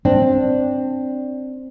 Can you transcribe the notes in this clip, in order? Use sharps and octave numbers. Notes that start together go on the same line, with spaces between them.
C4 D4